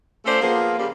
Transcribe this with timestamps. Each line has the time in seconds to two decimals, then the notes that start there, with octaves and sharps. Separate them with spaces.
0.26 A3 C#4 F4 A4 C5 D5
0.41 F3 A#3 B3 F4 G#4 A#4
0.78 C#3 G3 A#3